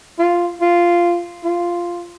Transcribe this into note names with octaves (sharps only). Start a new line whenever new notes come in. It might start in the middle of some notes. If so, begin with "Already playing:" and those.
F4
F4
F4